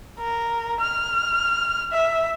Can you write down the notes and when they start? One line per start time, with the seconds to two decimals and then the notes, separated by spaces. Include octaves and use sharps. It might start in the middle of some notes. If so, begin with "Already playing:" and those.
0.19 A#4
0.80 F6
1.92 E5